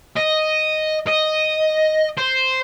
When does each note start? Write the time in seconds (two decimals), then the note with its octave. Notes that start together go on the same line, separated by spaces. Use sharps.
0.16 D#5
1.07 D#5
2.18 C5